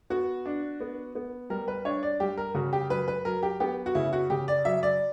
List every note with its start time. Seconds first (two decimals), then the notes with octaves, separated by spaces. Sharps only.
0.10 B3 F#4
0.46 D4
0.81 B3
1.15 B3
1.50 G3 A#4
1.68 B4
1.85 D4 C#5
2.03 D5
2.20 G3 G4
2.37 A#4
2.55 C#3 F#4
2.73 G4
2.90 F#3 B4
3.08 B4
3.25 F#3 A#4
3.43 G4
3.60 B3 G4
3.86 F#4
3.95 C#3 E4
4.13 F#4
4.30 C#3 G4
4.48 D5
4.65 F#3 E5
4.83 D5